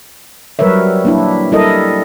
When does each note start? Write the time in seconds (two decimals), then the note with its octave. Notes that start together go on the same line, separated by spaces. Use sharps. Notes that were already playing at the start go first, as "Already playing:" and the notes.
0.59 F#3 G3 A#4 B4 C#5 E5
1.05 A#3 D4 E4
1.52 G3 E4 A4 A#4 D#5